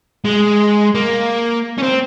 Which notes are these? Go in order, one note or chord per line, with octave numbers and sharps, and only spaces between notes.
G#3
A#3
C#4
C4